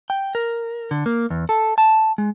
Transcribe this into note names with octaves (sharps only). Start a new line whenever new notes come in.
G5
A#4
D3
A#3
E2
A4
A5
G#3